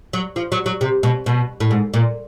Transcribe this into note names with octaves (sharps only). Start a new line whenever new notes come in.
F#3
F3
F#3
F#3
C3
B2
B2
A2
G#2
A#2